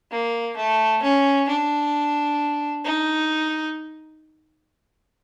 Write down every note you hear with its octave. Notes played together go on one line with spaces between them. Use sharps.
A#3
A3
C#4
D4
D#4